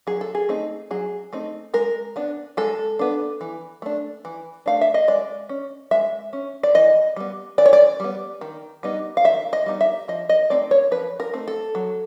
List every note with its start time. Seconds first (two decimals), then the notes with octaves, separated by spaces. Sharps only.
0.07 F#3 G#4
0.21 A4
0.35 G#4
0.49 A3 C4 D#4
0.91 F#3 G#4
1.33 A3 C4 D#4
1.74 G#3 A#4
2.16 B3 D4
2.57 G#3 A4
2.99 B3 D4
3.41 E3
3.82 A3 D4
4.25 E3
4.66 A3 D4 F5
4.81 E5
4.94 D#5
5.08 G#3 D5
5.49 C#4
5.91 G#3 E5
6.33 C#4
6.63 D5
6.74 E3 D#5
7.16 G3 B3
7.58 E3 D5
7.66 C#5
7.73 D5
8.00 G3 B3
8.41 D#3
8.83 G3 B3 D#4
9.17 F5
9.24 D#3 E5
9.53 D#5
9.66 G3 B3 D#4
9.81 E5
10.08 F3 D#5
10.29 D#5
10.50 A3 C4 D#4 D5
10.71 C#5
10.91 F3 B4
11.20 A#4
11.33 A3 C4 D#4
11.48 A4
11.75 F#3